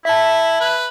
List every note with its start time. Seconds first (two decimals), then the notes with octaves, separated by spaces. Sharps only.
0.05 E4 E5 A5
0.60 B4